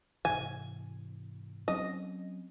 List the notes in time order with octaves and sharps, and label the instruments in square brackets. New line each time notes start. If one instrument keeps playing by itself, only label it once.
[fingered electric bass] G#2 C3 E3 [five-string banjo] G#5
[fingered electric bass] F#3 C4 C#4 [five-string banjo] D#5